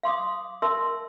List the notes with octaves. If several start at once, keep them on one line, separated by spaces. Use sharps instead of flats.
F5 C6 D6 D#6
A#4 E5 A5 C6 E6